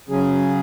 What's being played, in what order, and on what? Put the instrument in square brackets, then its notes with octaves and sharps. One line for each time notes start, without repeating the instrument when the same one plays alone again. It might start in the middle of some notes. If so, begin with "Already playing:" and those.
[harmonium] C#3 F#3 C#4 G#4